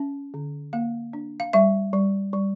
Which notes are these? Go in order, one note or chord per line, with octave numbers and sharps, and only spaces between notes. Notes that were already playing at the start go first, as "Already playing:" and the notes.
Already playing: C#4
D3
A#3 F5
D4
F5
G3 E5
G3
G3